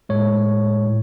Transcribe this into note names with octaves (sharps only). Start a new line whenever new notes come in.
A2 G#3 C#5
A2